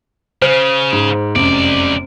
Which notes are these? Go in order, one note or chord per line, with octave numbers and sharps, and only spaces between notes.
C#3 C5 F6
G#2
F1 C2 F#2 D5